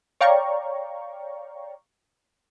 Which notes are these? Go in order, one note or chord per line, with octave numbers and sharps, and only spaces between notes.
C#5 D5 F5 G5 A#5 C#6